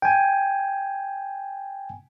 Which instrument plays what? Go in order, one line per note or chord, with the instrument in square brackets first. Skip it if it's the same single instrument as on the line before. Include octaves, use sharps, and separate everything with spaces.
[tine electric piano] G5 G#5